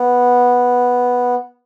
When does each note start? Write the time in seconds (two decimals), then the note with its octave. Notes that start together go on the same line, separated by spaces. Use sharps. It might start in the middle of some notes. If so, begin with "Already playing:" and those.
Already playing: B3